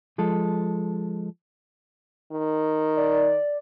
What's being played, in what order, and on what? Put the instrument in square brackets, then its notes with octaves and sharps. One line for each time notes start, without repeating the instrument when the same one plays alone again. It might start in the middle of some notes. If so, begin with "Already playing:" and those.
[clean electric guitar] F3 G#3 A4
[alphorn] D#3
[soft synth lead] D5